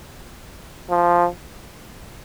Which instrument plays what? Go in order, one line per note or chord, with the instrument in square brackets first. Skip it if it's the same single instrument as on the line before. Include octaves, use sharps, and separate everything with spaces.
[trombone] F3